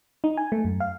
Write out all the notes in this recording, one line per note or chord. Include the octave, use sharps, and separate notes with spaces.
D#4
G#5
A3
F#2
F5